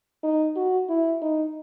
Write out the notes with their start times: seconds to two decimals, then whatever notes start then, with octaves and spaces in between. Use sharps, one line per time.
0.23 D#4
0.56 F#4
0.89 E4
1.22 D#4